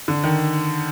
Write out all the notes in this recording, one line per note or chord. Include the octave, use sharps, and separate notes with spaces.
D3
D#3